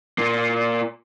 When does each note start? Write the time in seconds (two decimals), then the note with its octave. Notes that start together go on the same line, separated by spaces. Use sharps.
0.18 A#2 A#3